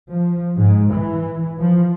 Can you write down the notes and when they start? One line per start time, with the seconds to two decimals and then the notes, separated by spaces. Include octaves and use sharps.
0.11 F3
0.60 G#2
0.95 E3
1.58 F3